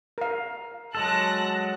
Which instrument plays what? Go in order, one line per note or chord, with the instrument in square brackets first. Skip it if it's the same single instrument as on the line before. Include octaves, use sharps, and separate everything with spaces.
[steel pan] A#4 F5
[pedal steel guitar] F#3 G#3 A4 [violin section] A5 F#6 A#6